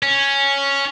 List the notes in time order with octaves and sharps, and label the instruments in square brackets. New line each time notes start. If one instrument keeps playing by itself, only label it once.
[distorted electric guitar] C#4